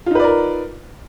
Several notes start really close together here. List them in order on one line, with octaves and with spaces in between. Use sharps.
F4 D#4 B4 D5 A#4